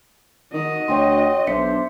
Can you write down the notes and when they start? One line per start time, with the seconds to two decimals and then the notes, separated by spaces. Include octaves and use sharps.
0.54 D#3 F#4 D#5
0.88 D2 C#5 G5 C6
1.47 B1 D4 C5 E5 B6 C#7